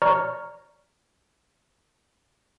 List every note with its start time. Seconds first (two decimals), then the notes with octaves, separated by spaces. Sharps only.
0.02 C#5 D5 A#5 C#6 F6